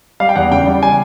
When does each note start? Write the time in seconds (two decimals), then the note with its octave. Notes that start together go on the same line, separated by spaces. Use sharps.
0.20 G3 F5
0.29 G5
0.36 E2 F#5
0.51 C#3 G5
0.67 G3
0.83 G#5